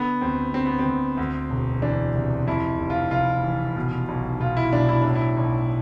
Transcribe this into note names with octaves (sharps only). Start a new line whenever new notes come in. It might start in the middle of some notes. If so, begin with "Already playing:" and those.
Already playing: D3 B3
D2 C4
D3 C4
B3
C4
D2
D2
E1
E3 D4
C3
F2 E4
F1
F4
F1 F4
E3
B2
B1
B2 F4
E4
B1 D4
E4
A2 D4
E4
B1